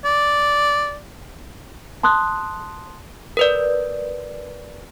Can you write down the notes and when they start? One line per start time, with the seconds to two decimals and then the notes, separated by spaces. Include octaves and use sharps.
0.05 D5
2.03 A5 C6 D#6 F#6
3.37 A#4 B4 D5